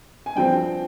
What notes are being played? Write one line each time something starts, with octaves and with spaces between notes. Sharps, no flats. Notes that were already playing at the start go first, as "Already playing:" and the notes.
G#5
G2 F3 C4 G5